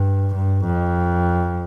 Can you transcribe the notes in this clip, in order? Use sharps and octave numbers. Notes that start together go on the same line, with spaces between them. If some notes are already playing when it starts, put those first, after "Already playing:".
Already playing: G2
G2
F2